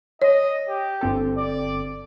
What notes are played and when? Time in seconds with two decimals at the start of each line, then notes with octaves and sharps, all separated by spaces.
0.22 C#5 D#5
0.68 G4
1.01 G1 C4 A4
1.37 D5